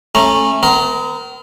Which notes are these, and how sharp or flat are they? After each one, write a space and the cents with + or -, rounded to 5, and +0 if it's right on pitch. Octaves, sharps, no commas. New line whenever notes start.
A3 +0 C#4 -20 A#5 +0
B3 +45 A#4 +0